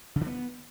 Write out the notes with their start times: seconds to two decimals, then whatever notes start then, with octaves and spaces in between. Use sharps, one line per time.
0.16 C#3
0.21 D3
0.26 B3